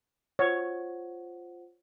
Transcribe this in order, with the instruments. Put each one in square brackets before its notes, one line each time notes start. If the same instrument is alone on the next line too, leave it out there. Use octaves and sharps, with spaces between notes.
[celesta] F4 C5 F#5 [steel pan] C#5